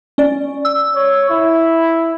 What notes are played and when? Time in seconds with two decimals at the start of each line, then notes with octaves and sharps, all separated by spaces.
0.18 C#4 D5
0.65 E6
0.95 C#5
1.30 E4